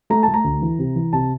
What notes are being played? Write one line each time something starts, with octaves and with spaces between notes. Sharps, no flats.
A3 A#5
A5
A3
A#5
D2
E3
C3
E3
C3 A5